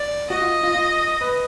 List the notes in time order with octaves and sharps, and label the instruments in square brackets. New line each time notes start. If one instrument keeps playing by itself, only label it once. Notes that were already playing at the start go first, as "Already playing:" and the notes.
Already playing: [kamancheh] D5
[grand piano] F#4 [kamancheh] D#5
[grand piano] F4
F4
F4
B4